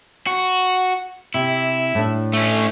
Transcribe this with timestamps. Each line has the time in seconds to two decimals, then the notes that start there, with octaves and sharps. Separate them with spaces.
0.27 F#4
1.34 C3 E4
1.95 A2 D4
2.33 A3 C#4